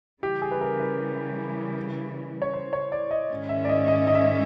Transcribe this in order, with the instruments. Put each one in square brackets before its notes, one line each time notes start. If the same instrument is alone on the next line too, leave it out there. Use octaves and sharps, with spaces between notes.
[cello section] C#3 E3 G3 [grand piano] G4
[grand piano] G#4
B4
A#4
B4
C#5
C5
C#5
D5
D#5
[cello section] G#2 D#3 G#3 C#4
[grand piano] E5
D5
D#5
D#5
D#5
E5
D#5